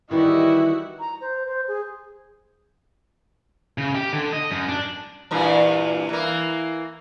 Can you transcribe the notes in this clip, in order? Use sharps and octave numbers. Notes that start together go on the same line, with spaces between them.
D#3 E3 G3 E4 F#4 G4 D#5 E5
A#5
C5
C5
G#4
C#3
G4
D3
D#5
F#2
D4
G2 A#2 E3
E3 A#3